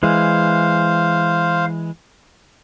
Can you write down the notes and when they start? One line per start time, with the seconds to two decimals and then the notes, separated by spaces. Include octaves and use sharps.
0.03 E3 G#3 C5 F5